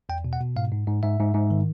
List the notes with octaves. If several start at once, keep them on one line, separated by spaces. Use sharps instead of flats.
E2 G5
B2
F#5
B2
G#2 F5
G#2
G#2
G#2 E5
G#2
G#2
D#3